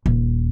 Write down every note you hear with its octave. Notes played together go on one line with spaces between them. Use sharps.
D#1